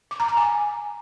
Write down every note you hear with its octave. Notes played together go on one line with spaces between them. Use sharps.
D6
A#5
D6
G#5